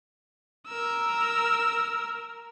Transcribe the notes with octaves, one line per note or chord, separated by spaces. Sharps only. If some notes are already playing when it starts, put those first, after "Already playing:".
A#4 E6